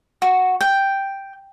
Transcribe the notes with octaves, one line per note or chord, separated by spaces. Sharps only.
F#4
G5